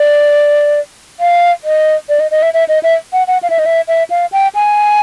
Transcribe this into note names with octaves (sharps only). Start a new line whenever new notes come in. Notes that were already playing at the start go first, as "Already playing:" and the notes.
Already playing: D5
F5
D#5
D5
D#5
D#5
E5
E5
D#5
E5
F#5
F#5
F5
E5
D#5
E5
E5
F5
G5
G#5